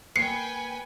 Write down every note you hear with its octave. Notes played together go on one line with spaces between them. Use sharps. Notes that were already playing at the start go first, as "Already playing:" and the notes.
A#3 B4 G5 G#5 C7 C#7